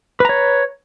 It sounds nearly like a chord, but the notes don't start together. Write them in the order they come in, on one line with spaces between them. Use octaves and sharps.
B4 A#5 C#5